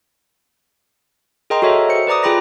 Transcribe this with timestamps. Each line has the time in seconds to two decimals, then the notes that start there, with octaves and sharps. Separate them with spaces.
1.50 G#4 A#4 D#5 G5 A#5 C6
1.62 F#4 G#4 A4 C#5 D#5 E5
1.89 C5 C#7
2.07 B4 D5 A#5 D6 D#6
2.23 F4 G#4 G5 B5 D6 A#6